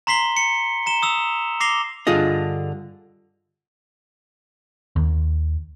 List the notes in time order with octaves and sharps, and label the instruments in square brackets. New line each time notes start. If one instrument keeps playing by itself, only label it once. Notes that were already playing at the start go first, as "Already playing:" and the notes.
[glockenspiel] A#5 C6 B6 C7 G7
C#7
A#5 E7 G7
D#6 E6 F7
D6 A#6 C7 F7 G7
[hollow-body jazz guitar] G2 D3 F4 G#4 D#5
[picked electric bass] D#2